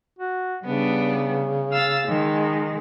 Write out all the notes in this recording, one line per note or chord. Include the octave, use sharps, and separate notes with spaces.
F#4
C#3 G3 B3 D4
F5 E6 A6
D#3 G#3